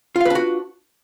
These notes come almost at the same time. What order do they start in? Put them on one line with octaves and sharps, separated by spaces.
F4 F5 B4 D4 F#4